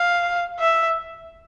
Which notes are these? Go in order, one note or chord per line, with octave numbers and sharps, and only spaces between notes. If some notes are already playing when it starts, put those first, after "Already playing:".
Already playing: F5
E5